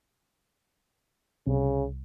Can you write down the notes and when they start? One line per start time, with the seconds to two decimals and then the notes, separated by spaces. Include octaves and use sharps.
1.47 C2 C#3